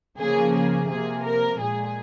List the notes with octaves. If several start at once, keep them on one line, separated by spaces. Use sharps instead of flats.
C#3 F3 A#3 G#4
G#4
C3 F3 A#3 G#4
A#4
A#2 G#3 G#4